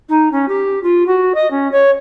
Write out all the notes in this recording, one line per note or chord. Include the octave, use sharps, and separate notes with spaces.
D#4
C#4
G4
F4
F#4
D#5
C#4
C#5